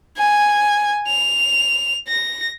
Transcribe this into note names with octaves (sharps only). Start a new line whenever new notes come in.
G#5
F7
A#6